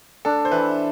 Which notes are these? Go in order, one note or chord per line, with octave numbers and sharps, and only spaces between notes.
D4 A4
C5
E3 B4